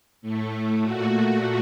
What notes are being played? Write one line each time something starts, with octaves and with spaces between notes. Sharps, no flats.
A2 A3
A#2 A3 F#4